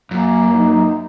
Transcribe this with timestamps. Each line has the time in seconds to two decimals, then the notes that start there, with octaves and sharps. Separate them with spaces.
0.11 F#2 A#3
0.55 D#4